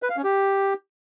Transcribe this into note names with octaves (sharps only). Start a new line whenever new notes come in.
B4
F5
C#4
G4